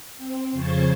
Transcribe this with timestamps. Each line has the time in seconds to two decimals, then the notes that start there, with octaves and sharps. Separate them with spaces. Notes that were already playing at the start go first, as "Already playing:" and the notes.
0.17 C4
0.51 F2 C#3 C5 C#6 G#6 A6